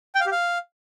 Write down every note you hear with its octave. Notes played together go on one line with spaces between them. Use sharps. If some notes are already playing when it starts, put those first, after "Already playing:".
G5
F5
G4
F5